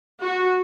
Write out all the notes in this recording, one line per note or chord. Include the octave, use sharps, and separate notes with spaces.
F#4